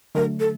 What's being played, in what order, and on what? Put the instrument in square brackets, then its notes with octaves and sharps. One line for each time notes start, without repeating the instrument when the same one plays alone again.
[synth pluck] D3 F#3 A3 [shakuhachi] A#4
[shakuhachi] A4